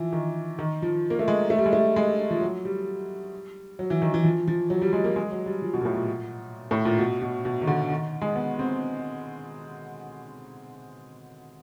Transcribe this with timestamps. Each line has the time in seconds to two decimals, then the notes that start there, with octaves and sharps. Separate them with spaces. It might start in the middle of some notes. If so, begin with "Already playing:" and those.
Already playing: E3 F3
0.13 D#3
0.59 D#3
0.82 F3
1.10 A#3
1.19 A3
1.28 G#3
1.50 A3
1.58 G3
1.66 G#3
1.73 A3
1.96 G#3
2.30 F3
2.41 F#3
2.65 G3
3.79 F#3
3.90 E3
4.02 D#3
4.14 E3
4.24 F3
4.47 F3
4.70 F#3
4.82 G3
4.93 G#3
5.04 A#3
5.16 G#3
5.32 F#3
5.46 G3
5.62 F3
5.74 B2
5.81 A#2
5.85 A2
5.96 A#2
6.71 A2
6.85 A#2
6.99 B2
7.22 B2
7.45 B2
7.62 D#3
7.67 D3
7.90 D#3
8.22 G#3
8.36 B3
8.59 C4